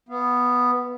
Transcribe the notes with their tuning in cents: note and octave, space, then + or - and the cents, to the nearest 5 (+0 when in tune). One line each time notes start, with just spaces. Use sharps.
B3 +0 F5 -30